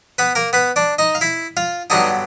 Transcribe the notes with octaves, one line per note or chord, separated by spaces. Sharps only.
B3 B4
A#3 A#4
B3 B4
D4 D5
D#4 D#5
F5
E4 E5
F4 F5
G2 D3 F#3 B3 D4 D#4 D#5